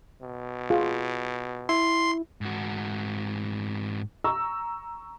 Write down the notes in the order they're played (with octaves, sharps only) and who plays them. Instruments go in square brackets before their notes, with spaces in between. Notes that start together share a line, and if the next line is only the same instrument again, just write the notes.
[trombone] B2
[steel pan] F4 G#4
[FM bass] E4 [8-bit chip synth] C6
[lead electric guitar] G#2 F#4
[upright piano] A#5 C#6 E6